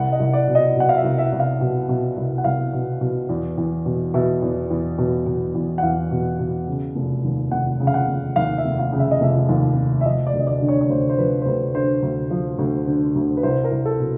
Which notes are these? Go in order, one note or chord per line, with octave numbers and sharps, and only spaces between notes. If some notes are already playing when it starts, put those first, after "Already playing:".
Already playing: C2 F#5
D#5
C2
D5
B2
D#5
B2 F#5
F5
E5
C2
E5
C2
F5
B2
B2
C2
F#5
C2 F5
B2
B2
E2
E2
B2
B2 E5
E2
E2
B2
B2
E2
F#5
E2 F5
B2
B2
C#3
F1
D#2
F1 F#5
C#3
F5
F#5
F1
D#2 F5
E5
F1
F5
C#3
E5
D#5
F1 E5
D#2
F1
E5
F3 D#5
D5
D2
D#5
D5
D3
C#5
C#5
D2 C5
C5
F3 B4
C5
D2 B4
D3 C5
D2
F3
D2
D3
D2
B4
C2 C5
A#4
C2
A4
B2